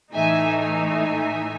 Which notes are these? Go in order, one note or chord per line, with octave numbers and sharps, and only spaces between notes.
A2 E3 A3 D#4 E5 G#5
E5 G#5